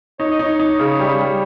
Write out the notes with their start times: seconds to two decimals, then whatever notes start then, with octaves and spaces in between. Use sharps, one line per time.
0.19 D#4 C#5
0.31 D#5
0.39 D#4 C#5
0.60 D#4
0.79 C#3
0.99 G3
1.19 G3